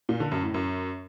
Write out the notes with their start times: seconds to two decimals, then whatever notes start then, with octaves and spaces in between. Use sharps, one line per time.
0.09 A#2
0.20 D3
0.32 F#2
0.43 A2
0.54 F#2